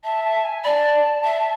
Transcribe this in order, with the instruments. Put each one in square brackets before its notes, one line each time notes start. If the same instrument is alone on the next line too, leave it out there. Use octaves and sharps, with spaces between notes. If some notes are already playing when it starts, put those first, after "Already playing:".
[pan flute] E5 [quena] A5
[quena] A5
G#5
[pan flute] D5 [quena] A5 B5
[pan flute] E5